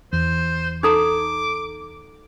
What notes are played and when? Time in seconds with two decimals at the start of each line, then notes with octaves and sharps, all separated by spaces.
0.13 E2 C5
0.83 D#4 A4 A#5 D6